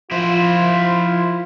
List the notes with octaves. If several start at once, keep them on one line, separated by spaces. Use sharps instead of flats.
F3 E4 F4 C5